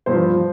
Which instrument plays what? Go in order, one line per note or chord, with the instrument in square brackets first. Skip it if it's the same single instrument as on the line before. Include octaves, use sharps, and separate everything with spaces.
[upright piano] G2 F3 C5